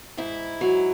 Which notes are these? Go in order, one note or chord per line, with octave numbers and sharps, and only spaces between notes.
G#2 E4
F#3